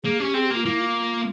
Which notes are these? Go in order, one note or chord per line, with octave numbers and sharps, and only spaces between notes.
A#3 G#4
C#4 G4
C4 G#4
G4
A#3 F4
A#3 E4
F4